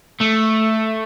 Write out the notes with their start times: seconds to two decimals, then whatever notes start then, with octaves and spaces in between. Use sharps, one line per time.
0.21 A3